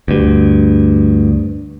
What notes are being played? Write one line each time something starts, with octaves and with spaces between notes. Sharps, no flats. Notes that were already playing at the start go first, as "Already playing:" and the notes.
D2 G2